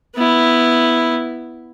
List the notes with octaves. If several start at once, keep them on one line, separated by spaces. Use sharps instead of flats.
B3 E4